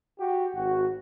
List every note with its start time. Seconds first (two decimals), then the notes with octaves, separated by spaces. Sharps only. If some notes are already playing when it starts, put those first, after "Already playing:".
0.19 F#4 G4
0.54 G#1 F#4